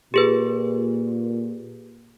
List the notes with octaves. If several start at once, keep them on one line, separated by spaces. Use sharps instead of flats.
A#2 G4 G#4 B4